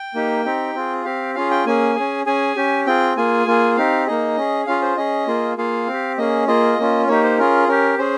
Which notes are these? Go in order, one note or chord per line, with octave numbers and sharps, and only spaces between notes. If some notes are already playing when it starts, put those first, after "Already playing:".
Already playing: G5
A#3 D#4 G4
C4 D#4 G4
C4 F4 G#4
C4 G4 F5
C#4 F4 G#4 F5
G5
A#3 C#4 G#4 G#5
C#4 G#4
C#4 G#4 G#5
C#4 G4
C4 F4 G#4 G5
A#3 F4 G#4 G#5
A#3 F4 G#4
C4 D#4 G4 F5
A#3 D#4 G#4 D#5
C#4 G#4
C#4 F4 G#4 F5
C5
C#4 G#4 D#5
A#3 F4 G#4
A#3 F4 G#4 F5
C4 G4
A#3 C#4 G#4 D#5
A#3 F4 G#4 D#5
A#3 C#4 F4
A#3 D#4 G4 C#5
C5
C#4 F4 G#4 A#4
C#4 G4 A#4
C#4 G#4 C5